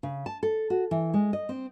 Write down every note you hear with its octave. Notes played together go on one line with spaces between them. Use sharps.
C#3
A5
A4
F#4
E3
G#3
D#5
C4